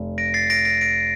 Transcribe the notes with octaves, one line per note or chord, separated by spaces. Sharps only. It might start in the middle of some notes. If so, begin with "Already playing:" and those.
Already playing: F1
A#6 D7
A6 C7
A#6 D7
A#6 D7
A#6 D7